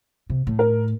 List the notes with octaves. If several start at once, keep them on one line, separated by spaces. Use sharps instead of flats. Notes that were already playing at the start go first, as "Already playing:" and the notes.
C3
A2
A#4